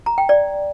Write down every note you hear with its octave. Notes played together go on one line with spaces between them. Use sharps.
A#5
G5
D5